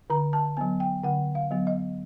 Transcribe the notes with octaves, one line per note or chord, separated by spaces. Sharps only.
D3 A#5
A5
F#3 B3 G#5
G5
D3 F#5
F5
F#3 B3
D#5